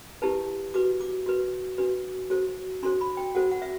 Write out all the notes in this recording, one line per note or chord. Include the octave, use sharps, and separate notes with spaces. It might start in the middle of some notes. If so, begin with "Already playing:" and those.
E4 G4 B4 A5
F#4 B4 D6
D6
F#4 B4
D4 F#4 B4
F#4 A4 C5
D4 F#4 A4 C5 C6
B5
G5
F#4 A4 C5 F#5
F#5
E5